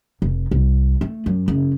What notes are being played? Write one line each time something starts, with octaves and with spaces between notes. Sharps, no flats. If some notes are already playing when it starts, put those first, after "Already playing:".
F1
C2
A3
F#2
F#1